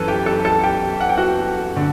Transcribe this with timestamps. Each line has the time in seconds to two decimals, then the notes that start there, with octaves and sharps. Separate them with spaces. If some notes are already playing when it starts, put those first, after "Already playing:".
Already playing: F#2 E3 A4 B4 A5
0.08 G4 G5
0.26 A4 A5
0.45 A4 A5
0.63 G4 G5
1.00 F#5
1.09 G5
1.18 F#4 F#5
1.76 D3